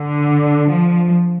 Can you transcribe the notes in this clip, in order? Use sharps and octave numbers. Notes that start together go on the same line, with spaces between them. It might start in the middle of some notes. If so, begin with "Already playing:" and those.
Already playing: D3
F3